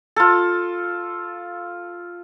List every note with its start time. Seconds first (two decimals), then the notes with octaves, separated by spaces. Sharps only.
0.16 F4 A4